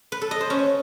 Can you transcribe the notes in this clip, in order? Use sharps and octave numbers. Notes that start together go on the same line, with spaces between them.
B4
A4
D#5
C5
C#4